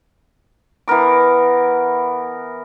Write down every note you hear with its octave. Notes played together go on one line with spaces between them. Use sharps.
E3 B3 A#4 D6